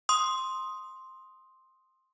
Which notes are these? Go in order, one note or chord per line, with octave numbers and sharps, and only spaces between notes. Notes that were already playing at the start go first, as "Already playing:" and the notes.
C6 D#6